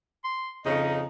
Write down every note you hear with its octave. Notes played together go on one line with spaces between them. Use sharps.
C6
F2 C#3 D#4 D#5